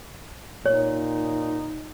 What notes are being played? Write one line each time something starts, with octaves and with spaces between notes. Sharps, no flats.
A#2 D#4 C#5